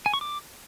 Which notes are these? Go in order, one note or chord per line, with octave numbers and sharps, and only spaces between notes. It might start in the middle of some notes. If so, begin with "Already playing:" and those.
G#5
C#6
D6